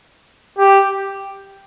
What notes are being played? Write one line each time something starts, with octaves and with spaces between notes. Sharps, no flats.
G4